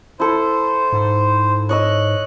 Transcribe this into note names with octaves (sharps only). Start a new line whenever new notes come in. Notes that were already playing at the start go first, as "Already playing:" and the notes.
E4 A4 C5
G#2
C#5 D#5 E6 F#6